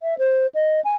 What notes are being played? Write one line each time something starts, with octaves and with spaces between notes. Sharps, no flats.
E5
C5
D#5
G#5